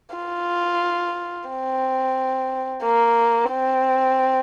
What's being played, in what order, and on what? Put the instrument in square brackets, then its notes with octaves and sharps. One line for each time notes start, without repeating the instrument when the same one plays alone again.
[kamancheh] F4
C4
A#3
C4